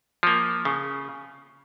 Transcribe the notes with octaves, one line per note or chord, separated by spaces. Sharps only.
F3 A#3
C#3